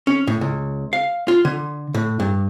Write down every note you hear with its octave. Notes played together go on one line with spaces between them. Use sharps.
C#4
A2
C#2
F5
F4
D3
A2
G2